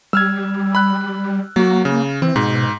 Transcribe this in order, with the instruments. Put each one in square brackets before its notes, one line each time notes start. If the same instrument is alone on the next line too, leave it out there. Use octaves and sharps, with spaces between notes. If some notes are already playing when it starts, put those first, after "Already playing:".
[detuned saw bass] G3 [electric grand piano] E6 F6 G#6
[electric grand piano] B5 F#6
[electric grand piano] F#3 F#4 [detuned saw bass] A#3
[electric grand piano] C#3
[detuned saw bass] E3 [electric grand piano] C4
[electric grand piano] G#2 [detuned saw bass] B2